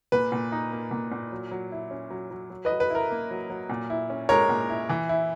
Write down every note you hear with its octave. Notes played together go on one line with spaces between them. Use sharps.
A#2 B4
A#2
D#4
A#3
A#2
A#2
F#3
F#3
E4
C#4
F#3
F#3
F#3
B4 D#5
F#3
B4
E4 A#4
A#3
F#3
F#3
A#2
E4
C#4
G#3 A#4 C#5
A#2
E4
E3
E4